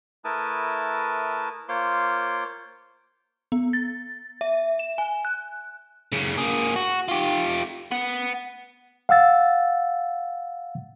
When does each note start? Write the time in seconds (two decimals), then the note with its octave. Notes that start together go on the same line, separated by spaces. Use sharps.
0.25 A3 E4 A#4 B4 A5 D#6
1.69 A#3 F4 C5 C#5 C6 D6
3.52 B3
3.73 A6
4.41 E5
4.79 E7
4.98 G#5
5.25 F#6
6.12 F#2 C#3
6.37 A#3 G#4
6.76 F#4
7.08 F4 G4
7.92 B3
9.09 F5 F#5 E6 A6